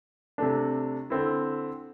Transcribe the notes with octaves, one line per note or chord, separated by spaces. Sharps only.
C3 A3 D4
D3 C4 E4